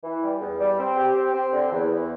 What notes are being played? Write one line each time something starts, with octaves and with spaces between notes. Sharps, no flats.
E3
G3
E2
G3
C4
G4
C4
C4
D3
E2
E2